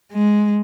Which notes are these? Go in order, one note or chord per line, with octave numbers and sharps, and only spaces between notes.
G#3